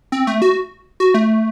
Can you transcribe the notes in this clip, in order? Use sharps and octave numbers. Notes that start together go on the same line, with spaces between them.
C4
A3
F#4
F#4
A3